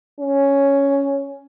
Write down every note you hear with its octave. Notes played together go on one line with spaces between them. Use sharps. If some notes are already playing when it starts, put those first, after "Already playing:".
C#4